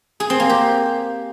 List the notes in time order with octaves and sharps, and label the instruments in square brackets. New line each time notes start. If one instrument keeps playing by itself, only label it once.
[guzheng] G#4
C4
A#3
G4